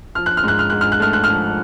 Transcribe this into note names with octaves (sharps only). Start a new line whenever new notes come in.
F3 F6
F#6
F6
G#2 F#6
F6
G#2 F#6
F6
F#6
A3 F6
F#6
F3 F6